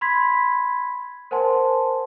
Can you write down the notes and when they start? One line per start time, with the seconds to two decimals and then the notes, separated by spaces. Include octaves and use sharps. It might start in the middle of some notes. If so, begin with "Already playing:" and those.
0.01 B5 C6 G#6 B6
1.31 A#4 C5 F#5 G#5 A5 C6